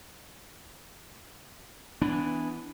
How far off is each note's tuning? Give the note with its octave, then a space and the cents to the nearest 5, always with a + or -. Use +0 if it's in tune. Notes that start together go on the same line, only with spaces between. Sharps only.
E3 +0 B3 +20 D4 -5